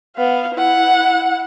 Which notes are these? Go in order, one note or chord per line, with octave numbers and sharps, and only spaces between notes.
B3 F5
E4 F#5